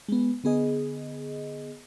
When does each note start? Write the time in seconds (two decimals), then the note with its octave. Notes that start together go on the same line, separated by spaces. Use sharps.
0.08 G#3 B3
0.44 D3 B3 G#4 D#5